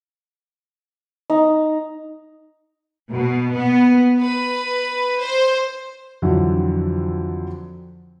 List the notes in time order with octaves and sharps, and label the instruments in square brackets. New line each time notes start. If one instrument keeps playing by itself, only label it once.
[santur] D#4
[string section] B2
B3
B4
C5
[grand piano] F2 D3 E3 F#3